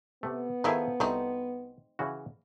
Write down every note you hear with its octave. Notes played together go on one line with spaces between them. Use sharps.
C3 A3 B3
D#3 F3 A3 E4 G#4 A#4
C2 A3 C4 D#4
C#3 E3 F#4